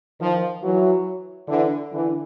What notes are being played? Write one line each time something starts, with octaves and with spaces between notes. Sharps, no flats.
D#3 F3
E3 F#3
D3 E3
D3 E3